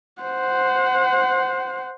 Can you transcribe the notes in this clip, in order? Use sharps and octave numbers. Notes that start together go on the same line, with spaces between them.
C5 F#5